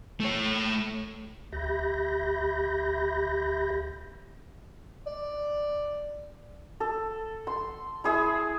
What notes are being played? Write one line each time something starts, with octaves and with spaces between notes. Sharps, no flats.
A3 C#5
D2 G4 E5 B5 G6 A#6
D5
A4
C6
E4 G#4 E5